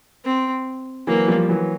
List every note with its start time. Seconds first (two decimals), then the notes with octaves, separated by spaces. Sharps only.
0.25 C4
1.07 E3 F#3 A#3
1.28 F3 G3
1.49 E3 F#3